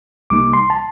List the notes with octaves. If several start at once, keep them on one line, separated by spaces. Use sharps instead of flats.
C2 C3 G3 A#3 D#4 D6
C6
A5